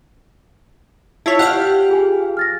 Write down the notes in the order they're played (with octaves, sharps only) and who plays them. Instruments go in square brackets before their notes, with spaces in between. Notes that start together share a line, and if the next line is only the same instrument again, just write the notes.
[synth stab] E4 F4 C#5 [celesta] A5 E6 B6
[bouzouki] G4 F5 [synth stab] F#5 F6
[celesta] F4 G#4 G#5
F6 A6 A#6